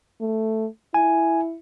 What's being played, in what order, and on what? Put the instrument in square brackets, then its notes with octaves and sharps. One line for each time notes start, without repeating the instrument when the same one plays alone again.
[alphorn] A3
[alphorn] E4 [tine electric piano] G#5